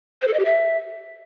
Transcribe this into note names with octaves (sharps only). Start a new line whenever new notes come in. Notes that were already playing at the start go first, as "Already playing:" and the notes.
C5
A4
D#5
G4
E5